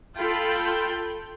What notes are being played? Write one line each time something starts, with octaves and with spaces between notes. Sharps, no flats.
F4 A4 G5 B5